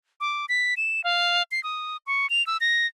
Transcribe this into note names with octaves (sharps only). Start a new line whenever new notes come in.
D6
B6
E7
F5
C7
D#6
C#6
F7
E6
A#6